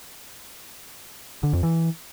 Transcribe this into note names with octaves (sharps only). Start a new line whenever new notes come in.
D3
F2
E3